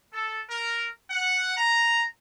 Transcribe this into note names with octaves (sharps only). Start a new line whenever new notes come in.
A4
A#4
F#5
A#5